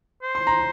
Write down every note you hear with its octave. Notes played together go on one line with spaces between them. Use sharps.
C5
C6
A#5